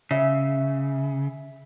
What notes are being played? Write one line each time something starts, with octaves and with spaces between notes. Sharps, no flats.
C#3 E5